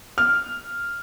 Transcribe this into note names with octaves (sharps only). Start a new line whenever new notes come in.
F6